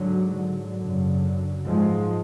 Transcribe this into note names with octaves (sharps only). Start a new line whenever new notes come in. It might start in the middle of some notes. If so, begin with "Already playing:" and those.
Already playing: G#2 D3 F#3
D3 F#3
F#2 C#3
G#2 F3 G#3